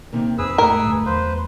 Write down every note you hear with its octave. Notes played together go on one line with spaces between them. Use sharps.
C3 D#3 A#3
F2 D#3 C4 G#4 B4 E6
A2 G#3 A3 A#4
D2 G2
E2 F#3 B4 C5 F5